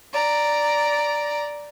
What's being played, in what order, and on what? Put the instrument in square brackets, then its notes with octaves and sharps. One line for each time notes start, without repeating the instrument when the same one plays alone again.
[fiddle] D5 A#5